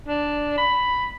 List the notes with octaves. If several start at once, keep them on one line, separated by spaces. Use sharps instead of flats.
D4
B5